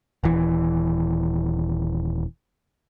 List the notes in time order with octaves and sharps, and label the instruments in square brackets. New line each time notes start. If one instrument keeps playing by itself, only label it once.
[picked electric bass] D#1 E3